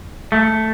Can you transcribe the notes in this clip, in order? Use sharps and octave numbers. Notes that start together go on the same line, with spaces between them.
A3